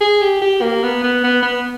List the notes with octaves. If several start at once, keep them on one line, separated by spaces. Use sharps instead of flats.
G#4
G4
G4
A#3
B3
B3
B3
B3